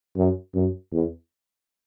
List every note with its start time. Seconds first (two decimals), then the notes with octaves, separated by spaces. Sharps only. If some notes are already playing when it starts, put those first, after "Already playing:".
0.17 F#2
0.55 F#2
0.92 E2